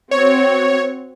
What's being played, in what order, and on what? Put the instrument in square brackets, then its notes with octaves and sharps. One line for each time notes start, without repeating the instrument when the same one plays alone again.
[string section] C4 F#4 [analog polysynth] C#5